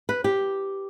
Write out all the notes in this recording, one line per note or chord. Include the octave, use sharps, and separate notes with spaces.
B4
G4